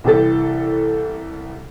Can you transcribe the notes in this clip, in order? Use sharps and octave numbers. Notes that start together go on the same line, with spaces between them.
C2 E3 G4 A4 A6